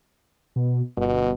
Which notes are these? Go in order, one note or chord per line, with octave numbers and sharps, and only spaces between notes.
B2
G1 B2